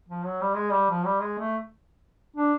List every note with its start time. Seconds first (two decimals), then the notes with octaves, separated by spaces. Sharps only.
0.09 F3
0.25 F#3
0.41 G3
0.57 G#3
0.73 G3
0.90 F3
1.06 G3
1.22 G#3
1.39 A3
2.36 D4